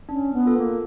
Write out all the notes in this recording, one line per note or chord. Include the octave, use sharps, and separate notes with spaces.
C#4 D4
B3
F4 A4
A#3